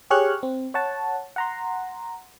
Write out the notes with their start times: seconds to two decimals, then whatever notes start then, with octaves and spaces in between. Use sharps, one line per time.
0.10 G4 G#4 C#5 C#6 F6 F#6
0.43 C4
0.74 C#5 F#5 A5
1.36 F#5 A#5 C6